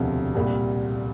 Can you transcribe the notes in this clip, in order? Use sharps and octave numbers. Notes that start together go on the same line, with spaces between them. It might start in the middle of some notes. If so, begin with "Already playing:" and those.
Already playing: E1 D2 C3 F3
C2 A#2 G3